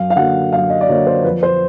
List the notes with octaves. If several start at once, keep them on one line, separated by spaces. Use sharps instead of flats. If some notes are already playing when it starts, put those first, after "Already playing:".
Already playing: F#2 F5
F5
D3 F#3 A#3 F#5
F#2 F5
D#5
D5
D3 F#3 A#3 C#5
C5
F2 B4
C5